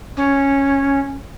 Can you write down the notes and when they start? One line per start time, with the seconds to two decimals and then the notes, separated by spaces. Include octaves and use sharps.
0.17 C#4